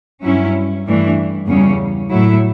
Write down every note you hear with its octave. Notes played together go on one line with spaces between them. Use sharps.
G2 F#3 C#4 E4
G2 E3 A3 D4
E2 C#3 G3 C#4
A2 F#3 A3 E4